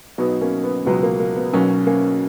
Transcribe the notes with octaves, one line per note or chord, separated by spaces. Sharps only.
B1 B2 F#3 B3 D#4
A#3 C#4
B3
C#2 B2 F#3 B3
A#3
A#3
B3
B1 B2 F#3 A#3 C#4
A#3 C#4